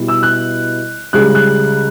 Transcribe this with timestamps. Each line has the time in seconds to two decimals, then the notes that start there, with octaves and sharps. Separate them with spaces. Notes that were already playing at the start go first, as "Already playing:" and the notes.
Already playing: B2 G3 E4
0.08 E6
0.23 F#6
1.13 C#2 C#3 G3 F#6
1.35 F#6